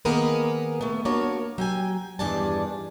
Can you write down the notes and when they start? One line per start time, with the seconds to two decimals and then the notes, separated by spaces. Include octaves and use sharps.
0.05 D#3 A#3 B3 G#4 A#4 B4
0.81 A3 B3
1.05 A#3 D4 F#4 C#5 F5
1.58 F#3 G5 G#5
2.19 E2 G2 D#3 D4 G#5 A5